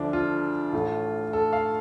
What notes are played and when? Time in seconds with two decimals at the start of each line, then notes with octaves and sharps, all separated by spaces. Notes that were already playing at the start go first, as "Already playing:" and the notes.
Already playing: D2 D3 F3 D4
0.13 F4
0.73 A1 A2 A3
1.33 A4
1.53 F5